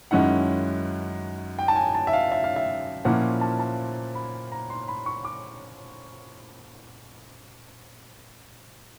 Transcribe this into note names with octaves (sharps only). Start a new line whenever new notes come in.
F#2 D#3 G#3 C#4 E4 F#5
G5
A5
G#5
A5
E5
F5
E5
F5
E5
A#2 F3 A#3 C#4 E4 F#5
A5
A5
B5
A#5
C6
B5
C#6
D6